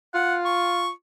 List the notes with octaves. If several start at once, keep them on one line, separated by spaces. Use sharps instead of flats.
F4 F#5
C#6